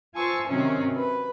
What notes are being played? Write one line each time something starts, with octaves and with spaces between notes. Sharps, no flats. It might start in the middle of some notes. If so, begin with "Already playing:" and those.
F4 C5 G#5 A5 C#6 E6
C3 D#3 F#3 C4 C#4
B4